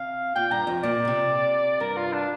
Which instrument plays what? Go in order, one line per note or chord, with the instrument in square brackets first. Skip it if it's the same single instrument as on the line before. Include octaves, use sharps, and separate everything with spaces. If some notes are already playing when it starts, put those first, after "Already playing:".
Already playing: [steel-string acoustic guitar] C3 [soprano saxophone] F5
[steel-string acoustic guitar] A#2 [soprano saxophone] G5
[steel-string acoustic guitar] G2 [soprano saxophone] A#5
[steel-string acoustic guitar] F2
[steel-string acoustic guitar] A#2 [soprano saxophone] D5
[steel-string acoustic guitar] C3
[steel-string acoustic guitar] G2 [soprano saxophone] A#4
[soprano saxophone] F4
D4